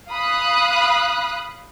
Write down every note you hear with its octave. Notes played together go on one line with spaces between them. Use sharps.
F5 B5 D#6 F#6